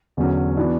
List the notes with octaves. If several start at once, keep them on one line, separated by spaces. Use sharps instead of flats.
E2 D3 F#3 C#4
E3 B3 D4 F#4